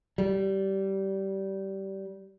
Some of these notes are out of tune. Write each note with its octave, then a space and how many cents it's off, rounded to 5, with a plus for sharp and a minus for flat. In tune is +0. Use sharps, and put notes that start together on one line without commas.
G3 -20